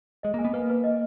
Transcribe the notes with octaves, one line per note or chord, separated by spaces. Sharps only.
G#3 D#5
A#3
G#5
B3
A#3 B4
B4
D#5